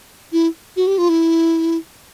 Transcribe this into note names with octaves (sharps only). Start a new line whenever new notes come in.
E4
F#4
G4
F4
E4